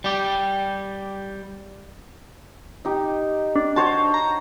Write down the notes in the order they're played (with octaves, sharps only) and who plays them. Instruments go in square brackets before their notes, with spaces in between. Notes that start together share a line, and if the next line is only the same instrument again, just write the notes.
[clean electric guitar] G3 G4
[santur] D#4 G4
[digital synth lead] D4
[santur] F#4 C5 C#5 [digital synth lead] A5
[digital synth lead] A#5